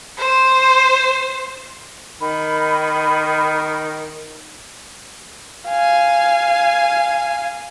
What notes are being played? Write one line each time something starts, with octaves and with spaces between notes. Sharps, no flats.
C5
D#3 B5
F5 G#5